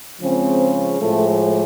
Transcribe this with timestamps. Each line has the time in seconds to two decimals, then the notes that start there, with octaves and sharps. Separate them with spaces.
0.21 C#3 F3 G#3 C4
0.99 A2 F3 G#3 A3